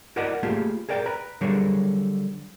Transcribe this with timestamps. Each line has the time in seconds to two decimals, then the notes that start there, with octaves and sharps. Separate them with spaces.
0.16 E4 F#4 A#4 D5 D#5 F#5
0.43 A3 A#3 F4 G4 G#4
0.89 G#4 A#4 D5 G5
1.06 B4 A#5
1.41 D3 F#3 G3 G#4 A#4 C#5